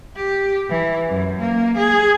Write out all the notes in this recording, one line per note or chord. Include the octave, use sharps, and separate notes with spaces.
G4
E3
F#2
A#3
G#4